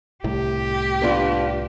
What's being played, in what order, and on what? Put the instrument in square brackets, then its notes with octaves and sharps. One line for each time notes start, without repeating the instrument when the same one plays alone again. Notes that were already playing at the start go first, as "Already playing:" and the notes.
[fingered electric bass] C2 A2 [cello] G4
[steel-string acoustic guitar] B3 D4 F4